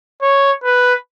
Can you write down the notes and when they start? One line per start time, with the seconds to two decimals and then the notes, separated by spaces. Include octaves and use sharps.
0.22 C#5
0.64 B4